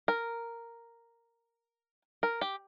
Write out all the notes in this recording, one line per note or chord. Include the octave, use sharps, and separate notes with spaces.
A#4
A#4
G4